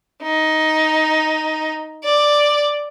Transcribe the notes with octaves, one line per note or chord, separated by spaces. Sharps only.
D#4
D5